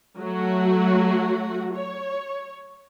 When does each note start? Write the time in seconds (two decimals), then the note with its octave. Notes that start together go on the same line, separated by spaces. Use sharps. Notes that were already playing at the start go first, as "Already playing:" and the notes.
0.20 F#3 A3 F#4
1.76 C#5